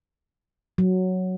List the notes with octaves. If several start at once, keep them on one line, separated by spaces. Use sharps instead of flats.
F#3